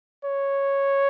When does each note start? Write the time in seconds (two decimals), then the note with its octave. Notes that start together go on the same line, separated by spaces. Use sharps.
0.25 C#5